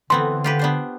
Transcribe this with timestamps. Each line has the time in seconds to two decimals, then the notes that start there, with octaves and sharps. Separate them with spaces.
0.10 D3 E3 B3 C4 C6
0.44 F4 G4 B4
0.59 B3 D4 C5